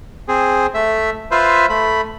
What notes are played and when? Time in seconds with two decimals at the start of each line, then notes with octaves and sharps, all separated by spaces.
0.28 C4 G#4
0.74 A3 E5
1.31 F4 B4 C5 E5
1.70 A3 B5